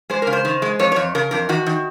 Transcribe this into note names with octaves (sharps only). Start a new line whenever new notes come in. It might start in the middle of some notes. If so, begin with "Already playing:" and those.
G#3 C5
C#3 A#4
C5
D#3
G#3
F2 C#5
F2 C#5
C#3 A#4
F2 A#4
D#3 F#4
D#3